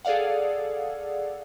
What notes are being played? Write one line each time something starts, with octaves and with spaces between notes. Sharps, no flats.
G#4 A4 D5 F5 F#5